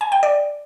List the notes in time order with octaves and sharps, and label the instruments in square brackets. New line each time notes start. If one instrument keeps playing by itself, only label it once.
[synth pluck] G#5
G5
D5